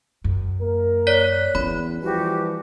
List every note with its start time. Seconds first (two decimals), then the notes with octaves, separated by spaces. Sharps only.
0.24 F#2
0.61 A#3 A#4
1.07 C#5 D5 F#6 B6
1.55 E2 C#4 B5
2.03 E3 F3 G3 F#4 G4